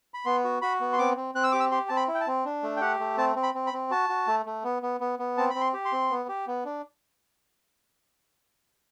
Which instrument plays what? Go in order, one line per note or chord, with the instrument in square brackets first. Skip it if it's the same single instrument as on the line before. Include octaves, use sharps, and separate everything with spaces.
[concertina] B5
B3 C6
F#4
F#4 B5
B3
C6
C4 D6
C4
C4 F#6
E6
G4 D6
E6
G4 C6
C4 A5
B5
E4
G5
A5
C4
D4
A3
G5
G4 F#5
A3
C4 A5
C4
B5
C4
B5
C4
F#4 A5
F#4
A3
A3
B3
B3
B3
B3
C4 A5
C4 B5
C6
G4
C6
C4
B3
G4
B3
D4